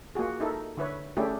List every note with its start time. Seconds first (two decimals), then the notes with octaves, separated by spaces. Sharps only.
0.15 A#3 F4 F#4 G#4
0.40 D#4 E4 A4 A#4
0.77 D3 E4 B4 C#5
1.17 A3 C#4 D4 E4 G4 G#4